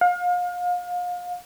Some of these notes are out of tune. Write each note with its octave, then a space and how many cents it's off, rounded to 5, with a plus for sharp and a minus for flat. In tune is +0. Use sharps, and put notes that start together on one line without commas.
F5 +35